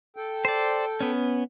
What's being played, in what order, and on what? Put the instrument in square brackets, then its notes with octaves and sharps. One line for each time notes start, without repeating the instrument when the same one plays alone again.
[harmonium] A4 G5
[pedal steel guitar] C5 D5
B3 C#4